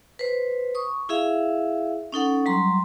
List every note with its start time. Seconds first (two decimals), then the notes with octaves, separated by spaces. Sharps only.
0.19 B4 C5
0.75 C#6 D#6
1.09 E4 G#4 E5 F5
2.12 C#4 D#4 A4 F#5
2.46 F#3 G3 A#5 C6